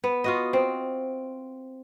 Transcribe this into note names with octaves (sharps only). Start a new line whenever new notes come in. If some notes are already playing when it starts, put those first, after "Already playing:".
B3
F4 F#4 D#5
C4